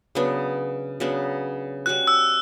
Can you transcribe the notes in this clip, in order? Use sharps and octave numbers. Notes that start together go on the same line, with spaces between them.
C#3 F#3 B3 D4
C#3 F#3 B3 D4
G3 C#4 F#4 F#6
E6